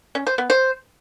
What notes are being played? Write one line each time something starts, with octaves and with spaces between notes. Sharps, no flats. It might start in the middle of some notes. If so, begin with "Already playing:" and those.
C#4
C5
B3
C5